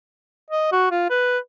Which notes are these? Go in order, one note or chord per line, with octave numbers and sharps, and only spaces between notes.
D#5
F#4
F4
B4